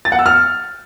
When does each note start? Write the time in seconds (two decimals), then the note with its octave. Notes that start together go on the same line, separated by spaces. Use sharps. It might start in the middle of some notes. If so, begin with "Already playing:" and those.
0.05 A6
0.12 F#5
0.19 E6
0.26 F6